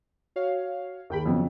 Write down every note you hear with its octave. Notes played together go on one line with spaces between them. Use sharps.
F#4 C#5 F5
D#2 D#3 G#4 G5 B5
F2 C#3 F#3 B3